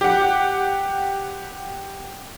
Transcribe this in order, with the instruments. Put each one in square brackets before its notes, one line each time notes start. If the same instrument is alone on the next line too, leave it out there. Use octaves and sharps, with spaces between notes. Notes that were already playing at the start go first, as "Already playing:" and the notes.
[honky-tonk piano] G4 F#5